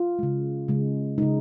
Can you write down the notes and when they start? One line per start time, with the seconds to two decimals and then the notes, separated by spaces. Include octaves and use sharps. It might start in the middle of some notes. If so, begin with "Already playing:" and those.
Already playing: F4
0.19 C#3 G#3
0.68 C#3 G#3
1.18 C#3 G#3 D#4